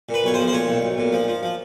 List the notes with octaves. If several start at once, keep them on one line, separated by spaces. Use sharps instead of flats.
A#2
B4
B1 C#5
C5
F3
C5
A#2 C#5
B1
B1
A#2
F3
F3
F3